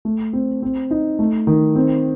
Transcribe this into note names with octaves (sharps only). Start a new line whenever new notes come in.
A3
C4
C4
D#4
A3
D#3
C4